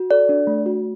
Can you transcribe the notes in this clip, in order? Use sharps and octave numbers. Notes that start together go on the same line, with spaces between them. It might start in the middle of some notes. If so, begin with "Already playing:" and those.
Already playing: F#4
A4 D5
D4
A3
F#4